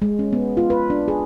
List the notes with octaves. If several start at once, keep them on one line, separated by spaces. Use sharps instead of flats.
G#3
C#4
B3
F4
B4
D4
G#4